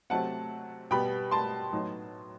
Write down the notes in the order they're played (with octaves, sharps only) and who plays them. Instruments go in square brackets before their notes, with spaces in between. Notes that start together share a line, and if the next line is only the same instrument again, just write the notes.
[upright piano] C3 F#3 A3 C4 F#5 A5
B2 G3 B3 G5 B5
A5 C6
A2 F#3 B3 D#4